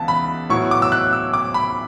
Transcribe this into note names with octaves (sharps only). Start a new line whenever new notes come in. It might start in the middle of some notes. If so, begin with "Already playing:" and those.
Already playing: C#2 E3 B3 A5
B5
A2 F#3 B3 E4 C#6
D6
E6
F#6
E6
D6
B5